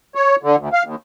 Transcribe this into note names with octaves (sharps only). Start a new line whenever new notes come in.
C#5
D3
D2
F5
D#2